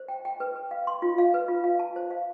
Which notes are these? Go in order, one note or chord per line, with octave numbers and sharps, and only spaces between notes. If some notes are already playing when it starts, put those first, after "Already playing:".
Already playing: C5
G5
G5
B4
B4
F5
C6
F4
F5
B4
F4
F5
A5
C5
F5